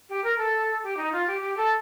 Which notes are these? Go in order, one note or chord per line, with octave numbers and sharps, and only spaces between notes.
G4
A#4
A4
G4
D#4
F4
G4
G4
A4